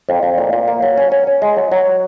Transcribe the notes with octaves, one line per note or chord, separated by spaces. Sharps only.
F2
F2
A#2
A#2
A#3
F#3
C#4
C#4
C#4
G#3
F#3
F#3